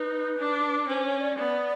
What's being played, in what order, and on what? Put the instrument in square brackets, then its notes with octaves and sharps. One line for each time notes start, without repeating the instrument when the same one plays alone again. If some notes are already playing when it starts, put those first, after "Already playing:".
Already playing: [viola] D#4 [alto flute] B4
[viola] D4
[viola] C#4 [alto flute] C5
[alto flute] C#5
D5
[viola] B3 [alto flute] D5